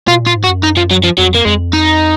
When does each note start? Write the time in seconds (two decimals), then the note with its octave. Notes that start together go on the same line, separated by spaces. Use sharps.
0.08 B2 F4
0.21 A#2
0.27 F4
0.36 G#2
0.44 F#4
0.48 F#2
0.63 D#4
0.77 F3
0.91 F#3
1.04 F3
1.18 F2 F#3
1.35 A#3
1.45 F2 G#3
1.73 D#4